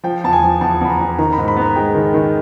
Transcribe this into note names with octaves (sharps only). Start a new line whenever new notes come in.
F3 G5
E2 A5
G#5
F3
E2 A5
E2 B5
A#5
E2
D#3 A#5
B5
G#2
B5
B3
A#5
G#3 G5
D#3
D#3